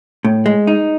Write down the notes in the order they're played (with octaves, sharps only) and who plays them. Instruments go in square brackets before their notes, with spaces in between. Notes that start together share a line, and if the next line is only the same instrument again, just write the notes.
[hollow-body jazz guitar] A2
G#3
D#4